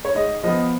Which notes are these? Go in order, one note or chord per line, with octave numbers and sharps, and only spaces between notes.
C#5
G#2 D#5
F3 B3 D#5